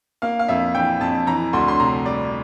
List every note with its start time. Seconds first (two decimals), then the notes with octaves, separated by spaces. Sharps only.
0.22 A#3 F5
0.39 F5
0.48 F2 E5
0.74 E3 G5
1.01 F2 A5
1.27 E3 A#5
1.53 D2 C6
1.68 C6
1.80 C3 A#5
2.05 G3 D5